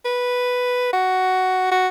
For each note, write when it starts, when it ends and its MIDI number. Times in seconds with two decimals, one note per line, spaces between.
0.05 0.91 71
0.93 1.68 66
1.71 1.88 66